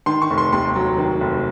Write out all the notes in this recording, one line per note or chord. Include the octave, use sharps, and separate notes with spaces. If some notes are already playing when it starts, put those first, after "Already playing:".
D#3 C6
C#6
F1
C6
D#2 C6
F#3
D#3
F1